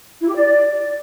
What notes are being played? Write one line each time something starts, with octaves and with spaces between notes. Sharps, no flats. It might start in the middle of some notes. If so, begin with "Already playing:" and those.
E4
G4
D5